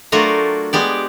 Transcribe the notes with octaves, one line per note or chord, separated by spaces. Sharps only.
F#3 A3 D4 F4 F#4 A#4
G#3 B3 G4 D5